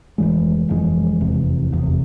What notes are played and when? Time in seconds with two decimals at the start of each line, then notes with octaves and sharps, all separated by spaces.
0.18 F1 F2 E3 G#3
0.69 F1 F2 E3 G#3
1.21 F1 E2 C3
1.72 F1 E2 C3